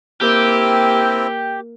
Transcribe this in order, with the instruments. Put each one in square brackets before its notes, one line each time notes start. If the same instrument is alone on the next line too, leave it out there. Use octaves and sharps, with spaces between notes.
[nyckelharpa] A#3 [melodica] C4 E4 [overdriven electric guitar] G4